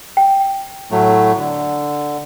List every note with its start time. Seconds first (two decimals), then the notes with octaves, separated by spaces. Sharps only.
0.17 G5
0.91 A2 F#3 A3
1.37 D3